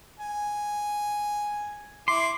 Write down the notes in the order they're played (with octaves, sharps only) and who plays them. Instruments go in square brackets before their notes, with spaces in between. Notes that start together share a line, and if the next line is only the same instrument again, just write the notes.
[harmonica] G#5
[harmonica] E4 D6 [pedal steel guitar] C6